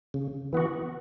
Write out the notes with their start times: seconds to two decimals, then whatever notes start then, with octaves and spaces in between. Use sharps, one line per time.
0.14 C#3
0.53 E3 B3 F#4